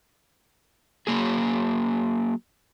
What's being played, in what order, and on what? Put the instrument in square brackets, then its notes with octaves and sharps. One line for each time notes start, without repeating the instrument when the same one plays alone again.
[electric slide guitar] F#3 A#3 G#4